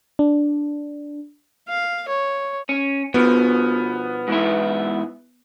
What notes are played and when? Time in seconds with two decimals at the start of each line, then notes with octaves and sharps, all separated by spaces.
0.19 D4
1.69 F5
2.08 C#5
2.69 C#4
3.14 B2 F3 B3
4.28 G#2 E3 E4